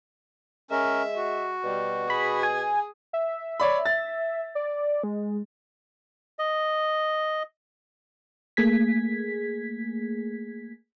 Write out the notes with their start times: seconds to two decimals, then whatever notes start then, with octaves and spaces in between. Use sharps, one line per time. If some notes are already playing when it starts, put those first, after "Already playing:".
0.71 G#3 C#4 A#4 E5
1.16 F#4
1.64 B2 G3
2.10 G#4 B5
2.43 G#5
3.13 E5
3.60 C#5 D5 B5
3.86 A6
4.55 D5
5.04 G#3
6.39 D#5
8.57 A3 A#3 G#4 G#6 B6